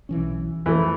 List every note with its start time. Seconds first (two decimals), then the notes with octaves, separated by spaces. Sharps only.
0.09 B1 E3 C#4
0.66 F2 E3 A3